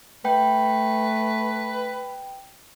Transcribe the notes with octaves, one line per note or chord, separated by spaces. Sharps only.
A3 B4 G5